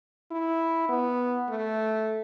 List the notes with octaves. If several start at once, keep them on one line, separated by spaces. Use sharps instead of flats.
E4
B3
A3